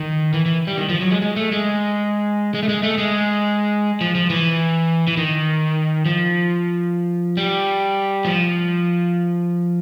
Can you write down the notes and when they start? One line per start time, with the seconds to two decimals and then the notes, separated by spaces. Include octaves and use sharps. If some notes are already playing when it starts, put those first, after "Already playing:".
Already playing: D#3
0.34 E3
0.46 E3
0.67 G3
0.78 D#3
0.89 F3
1.01 F#3
1.10 G#3
1.22 G#3
1.36 A3
1.52 G#3
2.54 G#3
2.63 A3
2.69 G#3
2.83 A3
2.98 G#3
4.01 F3
4.15 F3
4.30 E3
5.07 E3
5.17 D#3
6.06 F3
7.37 G3
8.25 F3